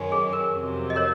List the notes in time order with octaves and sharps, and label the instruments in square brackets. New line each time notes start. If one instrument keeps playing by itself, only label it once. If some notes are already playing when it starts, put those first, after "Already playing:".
Already playing: [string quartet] F#2 D#3 G#3 C#4
[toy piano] G#4
A#4
[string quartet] F2 C3 F#3
[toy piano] D#5
A#4 C#5